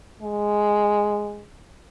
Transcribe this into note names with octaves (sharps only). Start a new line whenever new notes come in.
G#3